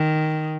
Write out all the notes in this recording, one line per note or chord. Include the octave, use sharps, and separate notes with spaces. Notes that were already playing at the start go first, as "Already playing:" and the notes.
Already playing: D#3